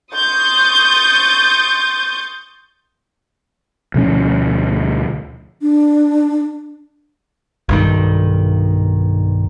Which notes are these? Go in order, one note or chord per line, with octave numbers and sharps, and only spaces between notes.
C6 C#6 D#6 G6 A6
D2 B2 F3 C#4
D4
B1 G2 D#3